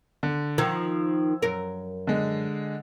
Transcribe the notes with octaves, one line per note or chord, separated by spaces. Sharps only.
D3
D#3 F3 E6 G#6
F#2 A#4
D3 G#3